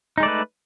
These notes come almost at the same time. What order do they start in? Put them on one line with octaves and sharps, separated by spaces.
D#4 G#3 D5 A3 B4